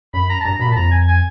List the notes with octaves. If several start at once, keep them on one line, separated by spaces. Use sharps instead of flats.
F#2 B5
A#5
A5
G2 A#5
B2 B5
A#2
A5
F2 A#5
G#5
G#5